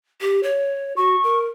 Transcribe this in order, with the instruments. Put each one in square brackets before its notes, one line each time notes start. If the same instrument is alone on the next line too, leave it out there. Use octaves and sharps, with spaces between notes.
[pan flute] G4
C#5
[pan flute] F#4 [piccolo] C#6
[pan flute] A#4